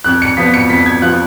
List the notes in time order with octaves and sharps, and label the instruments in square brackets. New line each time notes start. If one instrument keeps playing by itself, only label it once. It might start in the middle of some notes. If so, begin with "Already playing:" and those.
[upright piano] F2 F#6
C#7
F3 B3 F4 B6
C#7
F2 B6
G#6
F3 B3 F4 F#6